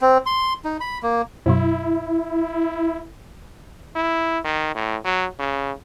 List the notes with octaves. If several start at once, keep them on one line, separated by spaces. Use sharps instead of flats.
C4
C6
D#4
B5
A#3
F#2 B2 F#3 E4
E4
D#3
A2
F#3
C#3